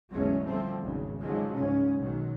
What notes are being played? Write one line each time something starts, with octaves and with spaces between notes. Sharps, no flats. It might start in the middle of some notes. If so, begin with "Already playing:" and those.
A1 E2 D3 F#3 G#3 C#4
D3 F3 G3 A3 C4
G#1 E2 C#3
G#2 D3 F3 F#3 G#3
C#2 G#2 C#3 C#4
B1 D#3 F#3